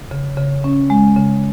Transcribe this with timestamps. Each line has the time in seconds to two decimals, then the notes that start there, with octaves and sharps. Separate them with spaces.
0.11 C#3
0.37 C#3
0.64 C#4
0.90 G#3
1.16 C#3